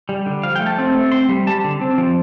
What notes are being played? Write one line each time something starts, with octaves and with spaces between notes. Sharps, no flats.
G3
D3
F3 F5
G5
A3
A5
C4
A3
C4 C6
G3
G3 A5
D3
C4
F3